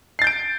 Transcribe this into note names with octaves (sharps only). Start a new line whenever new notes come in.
G6 A6 C7 D7